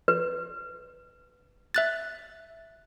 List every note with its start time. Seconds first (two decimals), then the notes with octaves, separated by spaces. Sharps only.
0.08 B4
1.74 E5 F#6 A6